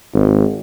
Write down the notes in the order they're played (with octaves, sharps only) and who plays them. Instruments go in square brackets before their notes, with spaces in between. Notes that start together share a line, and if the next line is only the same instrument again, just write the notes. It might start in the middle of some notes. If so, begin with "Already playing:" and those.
[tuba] G#1